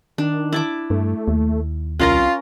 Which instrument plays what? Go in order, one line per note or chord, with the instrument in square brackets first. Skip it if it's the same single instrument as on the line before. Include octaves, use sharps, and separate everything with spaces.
[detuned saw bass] D#3 [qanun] D4
[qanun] E4 A5 D6
[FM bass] G2 [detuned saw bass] A3
[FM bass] D#2
[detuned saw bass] C2 [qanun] C#4 A#4 A#5 [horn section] F4